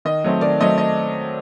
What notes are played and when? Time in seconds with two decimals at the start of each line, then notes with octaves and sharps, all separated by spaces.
0.05 D#3 D#5
0.24 F#3 A3 C4
0.41 D#3 D5
0.61 F#3 A3 C4 D#5
0.78 D#5